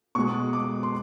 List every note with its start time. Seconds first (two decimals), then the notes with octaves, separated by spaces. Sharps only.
0.15 B2 G#3 C#6
0.53 D6
0.83 C6